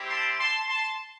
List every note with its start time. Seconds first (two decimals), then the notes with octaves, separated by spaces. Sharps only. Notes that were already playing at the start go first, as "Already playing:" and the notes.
Already playing: G3 C4 E4 G4
0.10 A5 C6
0.39 A5 C6
0.68 A5 C6